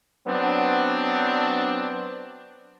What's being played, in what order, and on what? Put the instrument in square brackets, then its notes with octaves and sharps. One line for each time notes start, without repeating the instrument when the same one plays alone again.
[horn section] F#3 B3 C4 D4